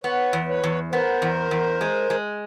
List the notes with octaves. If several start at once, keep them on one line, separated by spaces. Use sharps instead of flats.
B3 B4 C#5
E2
B4 C#5
E2
B3 A#4 C5
E2
E2
G#3
G#3